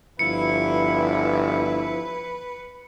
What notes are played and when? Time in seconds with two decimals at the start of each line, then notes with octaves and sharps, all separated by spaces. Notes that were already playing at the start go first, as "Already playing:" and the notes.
0.19 G1 F3 E4 B4 C#7